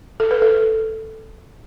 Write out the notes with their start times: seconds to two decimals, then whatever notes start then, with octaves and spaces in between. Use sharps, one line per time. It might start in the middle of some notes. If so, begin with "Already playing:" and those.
0.20 A4
0.31 B4
0.42 A4